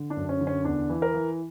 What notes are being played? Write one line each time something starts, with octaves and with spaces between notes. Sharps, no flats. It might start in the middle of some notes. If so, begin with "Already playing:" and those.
Already playing: D3
D4
F#2
C#4
D3
C#4
E2 D4
E3
A#4
E3